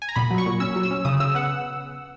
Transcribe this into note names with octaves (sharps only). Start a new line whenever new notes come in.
G#5
A#5
A#2 B5
F#3
C#6
A#2
C#4 E6
F#3
E6
C#4
C#3 D#6
C#3 E6
B3 F#5